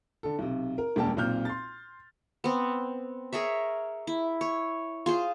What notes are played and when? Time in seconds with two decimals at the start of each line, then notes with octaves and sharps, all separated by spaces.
0.23 D3 A4
0.39 B1 C3
0.78 A#4
0.96 E1 F#2 G3 A#3 G4 A5
1.17 B1 A#2 C4 F6 G6
1.45 C6 A6
2.44 B3 C4
3.33 G#4 A#4 C#5 E5
4.07 E4
4.41 C#5
5.06 F4 G#4 C5